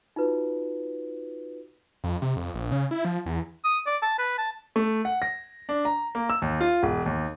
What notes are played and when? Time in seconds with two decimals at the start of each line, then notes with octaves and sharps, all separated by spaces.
0.16 D#4 F4 F#4 B4
2.04 F2
2.22 C3
2.36 F2
2.54 A#1
2.72 C#3
2.91 E4
3.05 F3
3.26 E2
3.64 D#6
3.86 D5
4.02 A5
4.19 B4
4.38 A5
4.76 A3
5.05 F#5
5.22 A#6
5.69 D4
5.85 A#5
6.15 A#3
6.30 E6
6.42 D#2
6.61 F4
6.83 E1
7.06 D#2